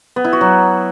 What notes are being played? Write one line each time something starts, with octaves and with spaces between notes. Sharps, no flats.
B3
E4
F#4
F#3